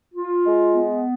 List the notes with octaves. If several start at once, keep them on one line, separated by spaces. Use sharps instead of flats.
F4
G#3
B3